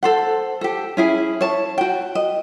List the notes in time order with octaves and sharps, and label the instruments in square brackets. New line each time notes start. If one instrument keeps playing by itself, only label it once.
[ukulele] A4 C5 F#5
G4 A4
C#4 E4 G#4
C#5 A5
F#4 G5
D#5